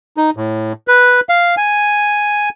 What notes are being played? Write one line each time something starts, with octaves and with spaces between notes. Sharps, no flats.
D#4
A2
B4
F5
G#5